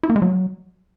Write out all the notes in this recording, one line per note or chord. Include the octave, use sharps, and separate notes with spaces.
E4
A#3
G#3
F#3